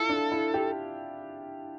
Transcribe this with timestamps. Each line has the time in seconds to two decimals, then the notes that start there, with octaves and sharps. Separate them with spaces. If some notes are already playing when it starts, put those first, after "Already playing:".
Already playing: E4 F4 A4
0.09 D4
0.32 E4
0.54 G4